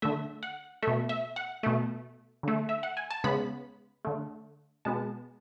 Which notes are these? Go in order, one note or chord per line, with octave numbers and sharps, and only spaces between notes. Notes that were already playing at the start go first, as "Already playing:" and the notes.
D3 A3 E5
F#5
B2 A3 E5
E5
F#5
B2 A3
D3 A3
E5
F#5
G#5
A5
C#3 G#3 B3 B5
D3 A3
B2 G#3 B3 A5